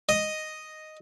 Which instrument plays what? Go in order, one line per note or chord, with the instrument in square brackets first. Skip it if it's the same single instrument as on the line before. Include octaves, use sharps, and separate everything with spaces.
[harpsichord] D#5